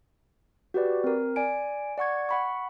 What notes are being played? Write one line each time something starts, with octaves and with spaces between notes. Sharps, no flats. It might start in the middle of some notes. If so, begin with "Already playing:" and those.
F#4 G4 B4 D5
C4 A#4
D5 G#5 D7
D5 F#5 C#6 G#6
F#5 B5 C#6